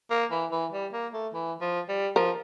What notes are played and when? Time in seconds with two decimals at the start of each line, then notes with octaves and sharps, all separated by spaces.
0.11 A#3
0.31 E3
0.52 E3
0.72 G3
0.93 A#3
1.13 A3
1.34 E3
1.61 F3
1.89 G3
2.16 F3 A#4